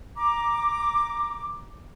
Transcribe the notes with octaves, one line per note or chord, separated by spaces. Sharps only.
A#5 D6